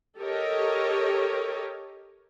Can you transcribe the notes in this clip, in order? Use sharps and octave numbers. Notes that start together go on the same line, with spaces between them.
G4 A4 A#4 C#5 D#5